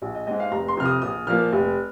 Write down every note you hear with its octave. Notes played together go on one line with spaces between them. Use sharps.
A#1
D#5
G#2 G#3 D#5
F5
F1 A#5
C6
F2 C3 F6
D#6
A#1 D#6
A#2 F3 A#3 F6
F1